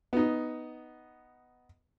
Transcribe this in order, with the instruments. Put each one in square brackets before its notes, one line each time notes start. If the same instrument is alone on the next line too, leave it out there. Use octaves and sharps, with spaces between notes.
[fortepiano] B3 D#4